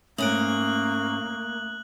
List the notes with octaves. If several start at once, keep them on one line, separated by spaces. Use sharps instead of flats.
G#2 A3 A#3 C#4 D#6 F#6 D7 F#7